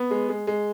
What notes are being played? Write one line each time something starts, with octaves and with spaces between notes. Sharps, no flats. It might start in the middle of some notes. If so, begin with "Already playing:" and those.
Already playing: B3
G#3
G#3
G#3